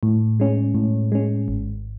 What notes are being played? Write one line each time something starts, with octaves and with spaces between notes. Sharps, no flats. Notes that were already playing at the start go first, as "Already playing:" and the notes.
A2
G#3 C#4
A2
G#3 C#4
G#1